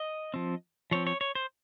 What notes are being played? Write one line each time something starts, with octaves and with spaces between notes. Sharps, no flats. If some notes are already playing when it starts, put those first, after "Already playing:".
Already playing: D#5
F3 C4
F3 C4 C#5
C#5
C#5
C5